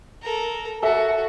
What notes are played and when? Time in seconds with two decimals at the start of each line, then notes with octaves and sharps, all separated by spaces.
0.22 A4 A#4
0.83 F#4 A4 E5